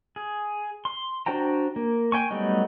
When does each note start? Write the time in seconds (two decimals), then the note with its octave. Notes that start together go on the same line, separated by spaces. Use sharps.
0.16 G#4
0.85 C6
1.26 D4 F#4 C5 G5 A#5
1.76 A#3
2.12 G5 G#5 C#6
2.31 F#3 G3 A3 B3 D#4